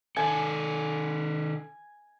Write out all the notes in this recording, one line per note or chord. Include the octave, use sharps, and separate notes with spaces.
D#3 A4 G#5